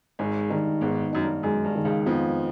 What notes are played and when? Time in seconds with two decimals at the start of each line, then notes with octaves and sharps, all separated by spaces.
0.19 G#1 G#2 G#3
0.50 G2 D#3
0.81 G#1 G#2 B3
1.13 F#2 D#4
1.23 G2
1.43 F#2 G#3
1.65 G2
1.76 D#3
1.85 C#2 C#3
2.06 F2 F3 B3